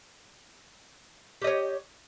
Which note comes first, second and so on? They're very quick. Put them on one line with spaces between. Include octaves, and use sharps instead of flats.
G4 D#5 C#5